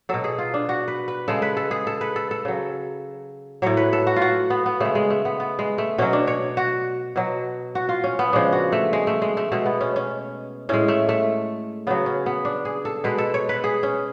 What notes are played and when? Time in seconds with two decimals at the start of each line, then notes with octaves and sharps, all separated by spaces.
0.09 B2 F#3 A4
0.24 G#4
0.38 F4
0.54 D4
0.69 F#4
0.88 B4
1.08 B4
1.28 C#3 G#3 A4
1.42 B4
1.57 A4
1.71 G#4
1.87 A4
2.01 B4
2.16 A4
2.31 A4
2.45 C#3 F#3
3.62 A2 F#3 C#5
3.77 B4
3.93 A4
4.07 F#4
4.16 F4
4.22 F#4
4.50 B3
4.66 B3
4.80 C#3 G#3 A3
4.95 G#3
5.10 A3
5.25 B3
5.40 B3
5.59 G#3
5.78 A3
5.98 B2 F#3 C#4
6.13 D4
6.27 C#5
6.57 F#4
7.16 B2 F#3
7.75 F#4
7.89 F4
8.04 C#4
8.19 B3
8.33 C#3 F3 G#3 D4
8.52 F#4
8.72 A3
8.93 G#3
9.07 A3
9.22 G#3
9.37 A3
9.52 B2 G#3 A3
9.66 B3
9.81 C#4
9.96 C#4
10.69 A2 G#3 C#4
10.88 A3
11.09 A3
11.87 C#3 F#3 B3
12.06 C#4
12.26 B3
12.45 D4
12.65 G#4
12.85 A4
13.04 B2 G#3 B4
13.18 A4
13.34 C#5
13.49 B4
13.64 G#4
13.83 C#4